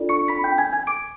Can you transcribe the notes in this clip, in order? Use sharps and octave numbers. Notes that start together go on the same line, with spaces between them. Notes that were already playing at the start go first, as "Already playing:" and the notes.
Already playing: D4 F4 A4 D5
C#6 C#7
B5 B6
G5 G6
G#5 G#6
G#5 G#6
D6 D7